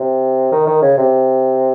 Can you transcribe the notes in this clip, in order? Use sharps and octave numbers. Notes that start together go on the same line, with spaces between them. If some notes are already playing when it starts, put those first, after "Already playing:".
Already playing: C3
D#3
D#3
C#3
C3